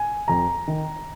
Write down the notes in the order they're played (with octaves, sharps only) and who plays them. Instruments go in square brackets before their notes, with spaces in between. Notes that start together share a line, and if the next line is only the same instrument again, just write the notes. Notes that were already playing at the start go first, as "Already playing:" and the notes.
Already playing: [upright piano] G#5
F2 A#5
D#3